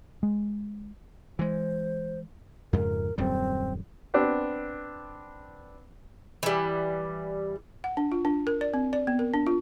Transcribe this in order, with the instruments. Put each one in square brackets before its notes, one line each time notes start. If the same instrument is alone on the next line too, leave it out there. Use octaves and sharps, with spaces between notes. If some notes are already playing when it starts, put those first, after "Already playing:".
[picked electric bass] G#3
[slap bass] E3 G#3 [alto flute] C5
[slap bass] F2 G#2 C#3 [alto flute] A#4
[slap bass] D#1 F#2 G3 [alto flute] C4
[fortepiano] B3 C4 D4
[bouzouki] E3 G3
[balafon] F#5
D4
F4
D4
A#4
D5
C4
D5
B3
A#4
D4
F4